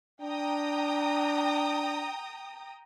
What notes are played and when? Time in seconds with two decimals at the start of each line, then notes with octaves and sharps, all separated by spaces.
0.22 D4 G5 A#5 D#6